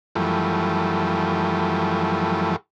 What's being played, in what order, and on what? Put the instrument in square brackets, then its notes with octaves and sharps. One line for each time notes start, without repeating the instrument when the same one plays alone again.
[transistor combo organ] F#2 E3 F3 G3 A3